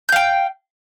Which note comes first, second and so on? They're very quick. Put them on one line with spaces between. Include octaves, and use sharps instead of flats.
G6 F5 G5